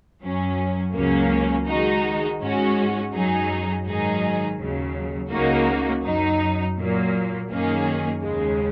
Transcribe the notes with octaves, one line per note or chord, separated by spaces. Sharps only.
F#2 F#3 C#4
C#2 C#3 F#3 A#3 C#4
D#3 G#3 D#4 F#4
G#2 G#3 C#4 F#4
F#2 F#3 D#4 G#4
G#2 D#3 F#3 D#4 G#4
D#2 C#3 F#3
C#2 C#3 A#3 D#4 F#4
F#2 F#3 D#4
A#2 F#3 A#3
F#2 D#3 A#3 C#4 G#4
D#2 C#3 G#3